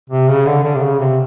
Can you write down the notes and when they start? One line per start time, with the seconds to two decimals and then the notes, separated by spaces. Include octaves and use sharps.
0.10 C3
0.29 C#3
0.46 D3
0.63 D3
0.75 C3
0.81 C#3
1.00 C3